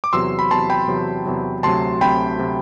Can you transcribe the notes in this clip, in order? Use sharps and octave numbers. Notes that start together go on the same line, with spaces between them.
D6
E2 C3 F#3 C6 E6
B5
E2 C3 F#3 A5 C6
G5 B5
E2 C3 F#3
E2 C3 F#3
D2 C3 F#3 A5 C6
D2 C3 F#3 G5 B5
C3 F#3